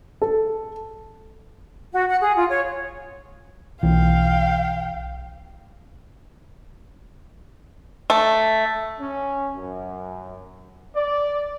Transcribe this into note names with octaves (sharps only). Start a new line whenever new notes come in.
A4
F#4
F#5
G#4
F4
C#5
B1 E3 F5 G5
A3
C#4
F#2
D5